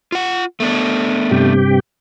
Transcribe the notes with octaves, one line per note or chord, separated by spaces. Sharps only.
F4 F#5
A3 B3 D4
G2 C3 G4